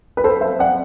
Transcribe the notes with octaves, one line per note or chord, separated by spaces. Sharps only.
B4
A4 C5
C5 E5
D5 F#5